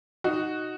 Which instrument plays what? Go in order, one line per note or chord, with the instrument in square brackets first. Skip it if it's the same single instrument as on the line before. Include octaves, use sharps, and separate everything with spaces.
[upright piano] D#4 F#4